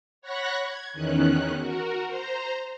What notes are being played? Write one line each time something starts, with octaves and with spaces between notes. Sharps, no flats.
C#5 F#5 B5 C#6 F#6 A#6
G#6
E2 D#3 C#4 F#6
F#4 A#4
C5 A#5